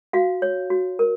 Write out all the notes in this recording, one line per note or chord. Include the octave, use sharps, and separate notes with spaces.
F#4 F5
C#5
F#4
A#4